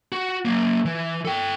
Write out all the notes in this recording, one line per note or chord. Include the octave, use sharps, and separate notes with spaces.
F#4
F#3 A#3
E3
A4 G5